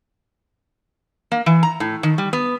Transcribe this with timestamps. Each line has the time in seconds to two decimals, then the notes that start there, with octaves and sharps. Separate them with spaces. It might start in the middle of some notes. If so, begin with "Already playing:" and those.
1.32 A#3
1.46 E3
1.63 A#5
1.80 A2
2.03 D#3
2.18 G3
2.33 B3